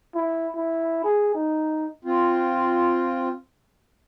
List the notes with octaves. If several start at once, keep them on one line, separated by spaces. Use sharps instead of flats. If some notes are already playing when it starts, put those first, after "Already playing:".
E4
E4
G#4
D#4
C4 F4